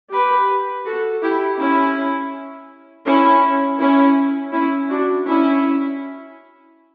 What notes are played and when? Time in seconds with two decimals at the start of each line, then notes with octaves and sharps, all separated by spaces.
0.12 G4 B4
0.86 F#4 A4
1.22 E4 G4
1.59 C#4 E4
3.06 C#4 E4
3.79 C#4 E4
4.52 C#4 E4
4.89 D4 F#4
5.26 C#4 E4